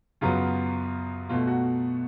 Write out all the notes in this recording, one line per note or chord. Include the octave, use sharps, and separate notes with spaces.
F#2 C#3 F#3 B3 F4
B2 A3 F4
F#4